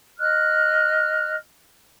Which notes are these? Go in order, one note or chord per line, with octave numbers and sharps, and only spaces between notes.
D#5 F6 F#6